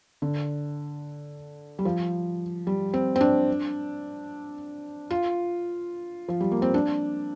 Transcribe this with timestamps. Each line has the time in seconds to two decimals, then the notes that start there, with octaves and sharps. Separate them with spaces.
0.22 D3
1.79 G3
1.85 F3
2.67 G3
2.94 C4
3.16 C4
3.21 D4
5.10 F4
6.28 F3
6.41 G3
6.52 A#3
6.62 C4
6.74 D4